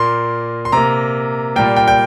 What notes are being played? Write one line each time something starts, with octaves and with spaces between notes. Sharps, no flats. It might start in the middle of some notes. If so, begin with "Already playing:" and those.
Already playing: A#2 A#3 C6
C6
C3 A#3 A#5
A#2 G3 A#3 G5
G5
G5